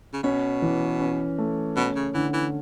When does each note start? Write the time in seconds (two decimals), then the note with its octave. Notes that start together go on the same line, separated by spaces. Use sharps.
0.14 C#3
0.23 B2 C#4
0.62 E3
1.00 C#4
1.38 A3
1.76 B2 C#4
1.96 C#3
2.14 D3 E3
2.34 E3